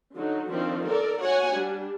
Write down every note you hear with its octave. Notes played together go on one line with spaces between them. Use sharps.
D3 F#3 D#4
D#3 F3 C4 D4
A4 A#4 D5
F#4 C#5 F#5 G#5
G3 D4